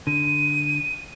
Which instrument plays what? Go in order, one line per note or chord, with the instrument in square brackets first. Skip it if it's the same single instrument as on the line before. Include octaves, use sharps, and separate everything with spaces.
[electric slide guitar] D3 [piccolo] D#7